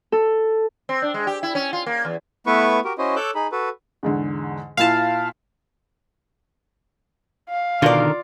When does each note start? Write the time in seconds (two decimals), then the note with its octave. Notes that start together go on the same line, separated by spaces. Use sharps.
0.12 A4
0.89 C4
1.02 D4
1.14 G#3
1.27 G4
1.43 E4
1.55 C#4
1.73 F4
1.86 A#3
2.05 E2
2.47 A3 B3 E4 B4 C#6
2.85 F#4 G4 A#4
2.98 C#4 E4 F#4 C5 D#5
3.16 A4 C#5 D6 E6 F#6 G6
3.35 D#4 G#4 B5
3.52 F#4 A4 B4
4.03 E2 G#2 D3
4.77 A#2 E4 F4 F5 A5
7.49 F5
7.82 B2 D3 D#3 F4 A#4 D5